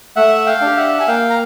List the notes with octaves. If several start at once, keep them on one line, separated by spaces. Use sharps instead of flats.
A3 E5 F#5
F5 G5
D4 G4
E5 F#5
G#5
A#3 F5 G5
A#5